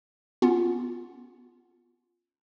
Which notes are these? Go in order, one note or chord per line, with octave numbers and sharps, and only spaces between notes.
B3 C#4 F4